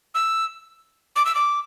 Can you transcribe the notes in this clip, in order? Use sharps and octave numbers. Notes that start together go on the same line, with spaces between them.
E6
D6
E6
D6